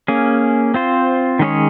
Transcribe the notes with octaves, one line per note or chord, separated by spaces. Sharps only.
A#3 C#4 G#4
C4 F4 C5
D#3 G#3 C#4 G#4 C#5